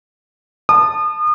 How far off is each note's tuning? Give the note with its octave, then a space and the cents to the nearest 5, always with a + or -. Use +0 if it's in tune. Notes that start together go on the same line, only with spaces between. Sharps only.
A5 +0 D#6 -35